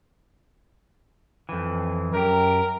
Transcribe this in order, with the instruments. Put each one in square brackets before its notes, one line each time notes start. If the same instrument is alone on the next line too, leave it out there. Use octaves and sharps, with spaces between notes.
[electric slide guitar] F2 E3
[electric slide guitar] F#2 G4 [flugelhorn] A#4